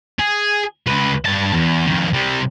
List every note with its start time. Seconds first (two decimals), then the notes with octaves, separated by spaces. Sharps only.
0.19 G#4
0.87 C#2 B4
1.25 G2 A5
1.53 E2
1.87 F2 D#3
2.13 C3 G3